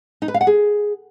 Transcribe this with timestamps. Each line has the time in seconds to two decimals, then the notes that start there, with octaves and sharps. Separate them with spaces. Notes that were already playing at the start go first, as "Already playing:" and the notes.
0.22 D#4
0.28 B4
0.34 F5
0.41 F#5
0.47 G#4